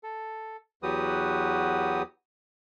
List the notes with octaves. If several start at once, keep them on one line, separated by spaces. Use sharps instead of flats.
A4
E2 F#3 F#4 G4 B4 D#6